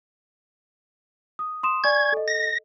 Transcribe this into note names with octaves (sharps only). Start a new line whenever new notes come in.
D#6
C6 D#6 E7
D5 G#5 C#6 G#6
A4 D#5
A#6